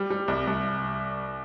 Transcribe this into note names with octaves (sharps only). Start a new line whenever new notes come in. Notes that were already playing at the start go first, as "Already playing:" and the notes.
Already playing: G3
G3
C2
C2